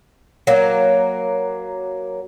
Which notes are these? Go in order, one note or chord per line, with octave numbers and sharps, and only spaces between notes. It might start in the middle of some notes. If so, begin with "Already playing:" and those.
F#3 A#3